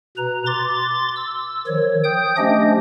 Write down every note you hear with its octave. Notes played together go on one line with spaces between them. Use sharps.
B2 B4 A#5
C6 D6 A6
E6
D#3 F3 C#5
G5 D#6 G6
F3 A3 C#4 D4 G4 D#5